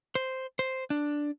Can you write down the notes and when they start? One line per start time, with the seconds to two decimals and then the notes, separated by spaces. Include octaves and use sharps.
0.15 C5
0.59 C5
0.90 D4